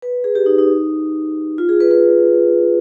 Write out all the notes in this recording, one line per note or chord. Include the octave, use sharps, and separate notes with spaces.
B4
G#4
G4
D#4
D#4
F4
G#4
B4
B4